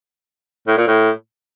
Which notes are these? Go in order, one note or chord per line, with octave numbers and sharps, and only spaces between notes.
A2
A#2
A2